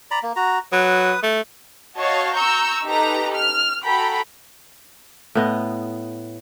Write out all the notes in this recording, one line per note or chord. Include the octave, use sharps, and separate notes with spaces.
D5 A#5 B5
A#3
F#4 A#5
F#3 B4 D#6
A3
F#4 C#5 D#5 F5 A5 C#6
A#5 C#6 E6 G6 C#7
D#4 G4 A4 B4 A#5
F6
F#4 A4 G5 A#5 B5
A2 B3 D#5